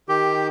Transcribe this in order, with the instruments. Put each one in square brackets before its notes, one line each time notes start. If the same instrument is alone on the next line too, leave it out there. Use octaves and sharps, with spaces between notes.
[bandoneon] D#3 [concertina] G4